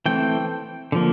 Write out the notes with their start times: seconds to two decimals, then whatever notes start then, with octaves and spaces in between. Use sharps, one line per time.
0.06 E3 A3 C4 G5
0.92 D3 F3 A#3